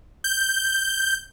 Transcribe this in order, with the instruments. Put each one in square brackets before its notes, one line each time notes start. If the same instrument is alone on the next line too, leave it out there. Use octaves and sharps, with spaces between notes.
[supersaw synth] G6